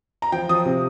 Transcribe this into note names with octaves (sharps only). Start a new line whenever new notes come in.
A#5
F3 G5
F3 D#6
C3